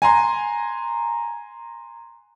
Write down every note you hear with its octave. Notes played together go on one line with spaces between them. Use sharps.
G#5 A#5 C6